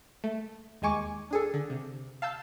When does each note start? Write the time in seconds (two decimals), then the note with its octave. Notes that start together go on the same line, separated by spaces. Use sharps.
0.24 A3
0.82 D#2 G#3 G#5 C#6 D6
1.31 D4 G#4 A4
1.54 D3
1.70 C3
2.22 F5 A5 E6 G6